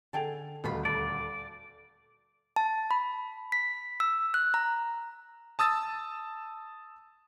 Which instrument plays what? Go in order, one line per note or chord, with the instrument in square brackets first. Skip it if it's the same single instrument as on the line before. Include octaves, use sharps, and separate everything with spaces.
[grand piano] D3 A4 F7 [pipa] G#4 G5 A5
[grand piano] D#1 D2 [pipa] B2 F4 B5
[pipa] A4 [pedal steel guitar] D5
[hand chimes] A5
B5
B6
E6
F#6
A#5
[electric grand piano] A5 D#6 E6 A6